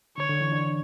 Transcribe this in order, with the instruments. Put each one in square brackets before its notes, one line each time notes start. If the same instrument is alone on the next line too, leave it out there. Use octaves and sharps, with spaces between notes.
[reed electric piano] D3 [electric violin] C#5
[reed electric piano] D3
E3
D4